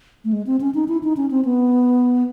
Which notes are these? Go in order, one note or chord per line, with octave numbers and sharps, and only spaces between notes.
A3
G#3
C4
C#4
D#4
E4
D#4
C#4
C4
B3